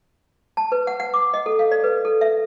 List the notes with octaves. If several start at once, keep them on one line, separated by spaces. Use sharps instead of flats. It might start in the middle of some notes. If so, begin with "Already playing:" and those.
A5
B4
F#5
F#5
D6
D#5
A4
F5
D5
B4
A4
E5